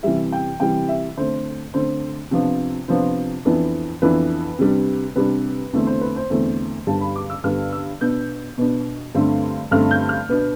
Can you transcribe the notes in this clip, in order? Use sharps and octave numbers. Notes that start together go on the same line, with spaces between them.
C3 E3 G3 E5
G5
C3 E3 G3 G5
E5
D3 A3 C4 C5
D3 A3 C4 C5
C3 F3 B3 D4
C3 F3 B3 D4 C5
F2 E3 B3 D4
F2 E3 B3 D4 B4
C3 G3 D4
C3 G3 D4 B4
E2 D3 A3 C4
C5
B4
C5
E2 D3 A3 C4
G2 D3 G3 B3 A5
B5
D6
E6
G2 D3 G3 B3 F6
E6
B2 B3 D4 G6
B2 B3 D4
G2 D3 A3 C4
G2 D3 A3 C4 F6
G6
F6
B2 B3 D4